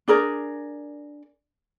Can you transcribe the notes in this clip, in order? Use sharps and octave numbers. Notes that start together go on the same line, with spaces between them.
D4 G#4 A#4 D5